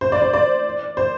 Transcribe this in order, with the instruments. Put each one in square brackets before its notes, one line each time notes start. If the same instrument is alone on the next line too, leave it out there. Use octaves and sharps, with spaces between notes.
[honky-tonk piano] C5
D5
C5
D5
C5